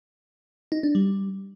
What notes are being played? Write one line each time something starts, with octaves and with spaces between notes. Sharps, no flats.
D#4
D4
G3